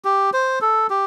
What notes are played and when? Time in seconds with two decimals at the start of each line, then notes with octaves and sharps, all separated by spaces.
0.05 G4
0.33 C5
0.61 A4
0.90 G4